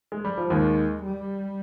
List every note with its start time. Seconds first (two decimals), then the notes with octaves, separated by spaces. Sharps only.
0.12 G#3
0.25 G3
0.38 F3
0.50 D#2 D#3 G#3
1.02 G3